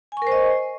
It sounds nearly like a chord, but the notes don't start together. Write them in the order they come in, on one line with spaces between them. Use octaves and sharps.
G#5 C#6 A#4 C5 D#5